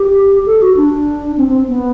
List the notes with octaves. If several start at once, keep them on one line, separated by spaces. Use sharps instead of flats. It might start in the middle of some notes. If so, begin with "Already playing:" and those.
Already playing: G4
A4
F#4
D4
C4
C4
B3